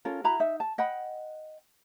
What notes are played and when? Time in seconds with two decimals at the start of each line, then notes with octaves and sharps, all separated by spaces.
0.05 C#4 F4 A4 A#4
0.24 E4 F#4 A#5 B5
0.40 D#4 E5
0.60 A5
0.78 D#5 F#5 G5 B5